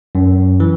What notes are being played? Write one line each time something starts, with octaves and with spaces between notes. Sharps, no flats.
F#2
E3